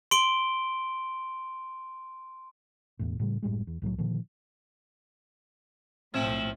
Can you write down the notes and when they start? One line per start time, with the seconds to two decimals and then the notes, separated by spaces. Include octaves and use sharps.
0.11 C6 D7 G7
2.99 E1 E2 A2
3.20 A2 C#3 G3
3.43 F#1 A2 G3 G#3
3.67 E2
3.82 C2 A2 D#3 F#3
3.98 A#2 D3 D#3 F3
6.14 B1 A2 F3 C4 E5